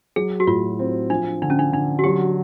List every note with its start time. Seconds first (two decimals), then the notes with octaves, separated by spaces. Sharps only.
0.16 F#3 G#4
0.40 F#4
0.47 A2 F4
0.79 C4
1.10 F3 D4
1.42 D3 D4
1.50 C#4
1.59 D4
1.72 D3 D4
1.99 F#4
2.04 F#3 G4